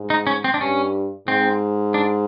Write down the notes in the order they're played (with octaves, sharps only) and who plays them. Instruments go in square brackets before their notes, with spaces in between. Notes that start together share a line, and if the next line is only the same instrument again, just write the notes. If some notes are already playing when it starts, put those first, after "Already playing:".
Already playing: [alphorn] G#2
[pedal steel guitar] D#4
C#4
C4
D4
[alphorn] G2 [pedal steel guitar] C#4
[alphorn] G#2 [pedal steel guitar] C4
[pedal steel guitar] D4